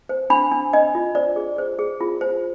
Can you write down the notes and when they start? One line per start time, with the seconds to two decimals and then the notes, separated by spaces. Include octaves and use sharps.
0.09 C5
0.30 D4 B5
0.52 D4
0.73 D4 D#5
0.95 F4
1.15 C5 D5
1.36 G#4
1.58 C5
1.79 G#4
2.01 F4
2.21 C5